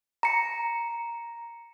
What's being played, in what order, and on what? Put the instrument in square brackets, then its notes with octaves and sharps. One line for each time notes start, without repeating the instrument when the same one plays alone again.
[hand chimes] A#5 C#7